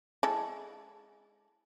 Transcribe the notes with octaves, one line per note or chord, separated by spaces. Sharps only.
G#3 E4 A4